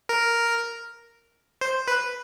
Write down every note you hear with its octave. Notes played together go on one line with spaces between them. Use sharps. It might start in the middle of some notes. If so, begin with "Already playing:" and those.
A#4
C5
B4